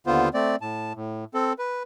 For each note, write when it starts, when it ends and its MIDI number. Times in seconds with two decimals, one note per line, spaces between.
0.07 0.29 39
0.07 0.29 50
0.07 0.29 59
0.07 0.29 65
0.07 0.29 72
0.34 0.56 57
0.34 0.56 60
0.34 0.56 74
0.61 0.93 45
0.61 0.93 81
0.95 1.25 45
1.34 1.53 60
1.34 1.53 69
1.59 1.83 71